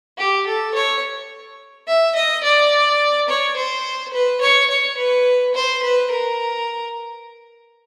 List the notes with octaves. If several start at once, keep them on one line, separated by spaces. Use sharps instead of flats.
G4
A4
C#5
E5
D#5
D5
C#5
C5
B4
C#5
C#5
B4
C5
B4
A#4